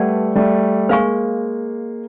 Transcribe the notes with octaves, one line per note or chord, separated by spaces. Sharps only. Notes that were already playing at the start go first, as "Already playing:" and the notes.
Already playing: G3 A3 B4 D5 F#5 A5
G3 A3
G#3 A#3 C5 F5 G#5 C#6